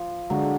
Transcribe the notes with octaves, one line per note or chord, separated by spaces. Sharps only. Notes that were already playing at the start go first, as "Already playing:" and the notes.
Already playing: F3
D3 F#3 G#3 D4